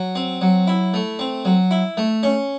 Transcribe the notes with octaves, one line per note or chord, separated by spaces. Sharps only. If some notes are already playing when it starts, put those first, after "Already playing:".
Already playing: F#3
C4
F#3
E4
A3
C4
F#3
E4
A3
C#4